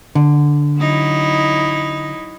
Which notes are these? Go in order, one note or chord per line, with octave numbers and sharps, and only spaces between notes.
D3
F#3 D#4 E4